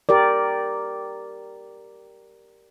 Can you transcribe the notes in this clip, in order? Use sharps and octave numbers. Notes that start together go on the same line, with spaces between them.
G4 A#4 D5